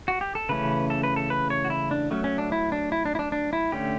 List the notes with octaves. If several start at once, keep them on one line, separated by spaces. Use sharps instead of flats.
F#4
G4
A4
C#3 E3 A3 C#4 B4
A4
B4
A4
B4
C#5
F#4
E4
D4
F#3 A3 C#4
C#4
D4
E4
D4
E4
D4
E4
D4
D4
E4
D3 A3 C#4 G4